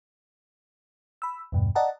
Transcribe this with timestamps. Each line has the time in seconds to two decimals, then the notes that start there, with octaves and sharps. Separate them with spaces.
1.22 B5 E6
1.52 E2 G2 B2
1.75 D5 D#5 F#5 A5 A#5